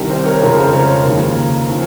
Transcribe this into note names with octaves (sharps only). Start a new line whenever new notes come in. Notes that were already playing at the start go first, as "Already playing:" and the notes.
Already playing: C2 C3 D#3 G3 A#4
C5
A#4 C#5
F2 C#3 F3 G#3 A#4
C5
C5
A#4 C#5
D#2 C#3 F3 A#3
F3 C4